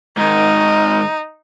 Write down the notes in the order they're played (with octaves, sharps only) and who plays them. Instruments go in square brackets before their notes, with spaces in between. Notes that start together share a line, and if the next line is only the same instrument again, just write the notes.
[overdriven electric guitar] G#2 D#3 [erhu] D#4